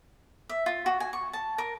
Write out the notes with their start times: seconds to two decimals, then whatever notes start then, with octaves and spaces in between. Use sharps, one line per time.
0.49 E5
0.66 F4
0.86 F#4
1.00 G#5
1.13 C#6
1.33 A5
1.58 A#4